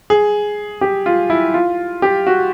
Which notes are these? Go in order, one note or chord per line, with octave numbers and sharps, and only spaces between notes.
G#4
G4
F4
E4
F4
G4
F#4